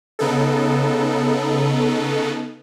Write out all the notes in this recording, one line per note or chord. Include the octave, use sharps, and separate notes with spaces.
C#3 B3 D#4 A4